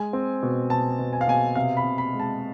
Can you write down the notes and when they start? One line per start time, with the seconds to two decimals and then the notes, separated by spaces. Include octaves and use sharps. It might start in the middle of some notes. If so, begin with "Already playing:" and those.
Already playing: G#3 G#5
0.13 C4
0.43 B2
0.70 B2 A5
0.99 B2
1.13 G#5
1.21 F5
1.27 B2 G#5
1.55 C3 F5
1.77 B5
1.84 C3
1.98 B5
2.13 G#3
2.20 A5